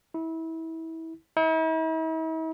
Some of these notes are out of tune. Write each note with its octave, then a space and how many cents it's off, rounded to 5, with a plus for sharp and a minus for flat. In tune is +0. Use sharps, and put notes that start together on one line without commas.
E4 -25
E4 -45